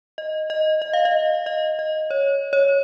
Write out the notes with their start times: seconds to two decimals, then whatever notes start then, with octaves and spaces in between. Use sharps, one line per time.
0.18 D#5
0.50 D#5
0.82 D#5
0.93 F5
1.05 D#5
1.46 D#5
1.79 D#5
2.11 C#5
2.53 C#5